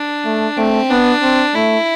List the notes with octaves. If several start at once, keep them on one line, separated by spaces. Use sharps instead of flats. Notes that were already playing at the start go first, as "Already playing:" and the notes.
Already playing: D4
A3
A3 C4
B3 D4
C4
A3 E4